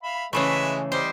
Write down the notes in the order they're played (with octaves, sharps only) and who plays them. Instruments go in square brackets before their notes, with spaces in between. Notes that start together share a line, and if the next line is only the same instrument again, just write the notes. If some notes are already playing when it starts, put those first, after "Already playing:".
[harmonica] E5 F5 B5
[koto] C#3 E3 A3 [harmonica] G#3 B4 E5
[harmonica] G3 D#5 [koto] C5